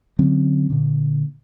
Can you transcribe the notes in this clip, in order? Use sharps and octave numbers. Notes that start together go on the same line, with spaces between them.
D3 F#3 C4 C#4
A#2 D3